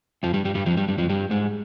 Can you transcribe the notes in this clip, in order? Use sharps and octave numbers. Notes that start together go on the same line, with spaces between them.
F2 F3
G2 G3
G2 G3
G2 G3
F2 F3
G2 G3
G2 G3
F2 F3
G2 G3
G#2 G#3